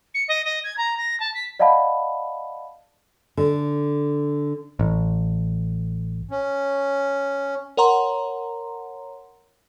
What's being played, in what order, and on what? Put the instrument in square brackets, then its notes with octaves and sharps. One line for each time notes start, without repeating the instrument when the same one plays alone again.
[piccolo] C#7
D#5
D#5
G#6
A#5
A#6
A5
B6
[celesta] D5 D#5 F5 F#5 A5 B5
[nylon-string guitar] D3
[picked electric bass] A1
[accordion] C#4
[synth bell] A#4 C#5 F#5 A#5 C6